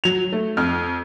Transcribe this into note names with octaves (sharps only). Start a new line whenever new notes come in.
F#3 F7
A3
F2 F6